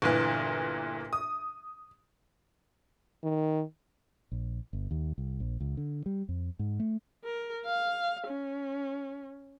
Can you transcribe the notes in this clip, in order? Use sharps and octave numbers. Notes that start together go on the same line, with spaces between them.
G1 A#2 E3
D#6
D#3
A#1
G1
D#2
C2
A#1
C#2
D3
G3
F2
G#2
A3
A#4
F5
C#4